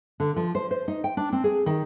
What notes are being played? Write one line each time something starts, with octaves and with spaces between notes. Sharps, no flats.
D3
F3
C5
C5
D#4
G5
D4
C4
G#4
D#3